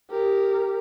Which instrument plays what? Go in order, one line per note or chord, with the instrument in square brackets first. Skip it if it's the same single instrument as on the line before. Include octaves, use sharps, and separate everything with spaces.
[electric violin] G4 A#4